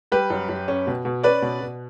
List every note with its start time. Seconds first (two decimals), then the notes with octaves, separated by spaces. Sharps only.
0.12 G3 G4 B4
0.30 F#2
0.49 F#2
0.68 C#4
0.87 B2
1.05 B2
1.23 C#4 B4 D5
1.42 B2
1.61 B2